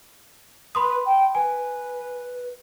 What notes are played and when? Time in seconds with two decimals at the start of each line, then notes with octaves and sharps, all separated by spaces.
0.75 B4 B5 C6 D#6
1.05 G5
1.35 B4 G#5